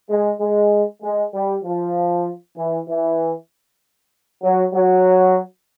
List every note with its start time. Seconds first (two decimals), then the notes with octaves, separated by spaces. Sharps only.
0.10 G#3
0.41 G#3
1.03 G#3
1.34 G3
1.64 F3
2.57 E3
2.88 E3
4.43 F#3
4.74 F#3